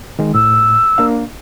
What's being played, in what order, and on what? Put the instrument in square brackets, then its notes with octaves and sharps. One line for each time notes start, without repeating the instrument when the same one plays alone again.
[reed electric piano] D#3 G#3
[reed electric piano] A2 [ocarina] E6
[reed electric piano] A#3 D4 F5